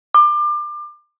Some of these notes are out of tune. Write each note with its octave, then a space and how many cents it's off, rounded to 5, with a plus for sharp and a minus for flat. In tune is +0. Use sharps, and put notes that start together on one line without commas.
D6 +30